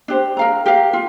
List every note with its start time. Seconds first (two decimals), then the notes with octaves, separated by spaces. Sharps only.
0.08 D4 G4 C5
0.37 A#4 F5 A#5
0.66 G4 A#4 F5
0.93 F4